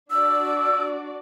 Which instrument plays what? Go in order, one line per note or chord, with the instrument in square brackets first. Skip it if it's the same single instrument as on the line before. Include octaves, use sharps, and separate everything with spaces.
[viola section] D4 F#4 D5 [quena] E6